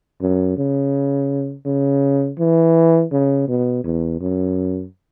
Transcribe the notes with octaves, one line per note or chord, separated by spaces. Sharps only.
F#2
C#3
C#3
E3
C#3
B2
E2
F#2